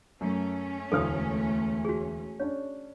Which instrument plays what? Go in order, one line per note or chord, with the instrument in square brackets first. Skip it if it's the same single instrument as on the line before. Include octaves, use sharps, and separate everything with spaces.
[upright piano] F#2 [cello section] A3 C#4
[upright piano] E1 D2 F6 [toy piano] A4 F5 D#6
[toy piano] F#4 G#4
[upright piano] C#4 D4 [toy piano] C#5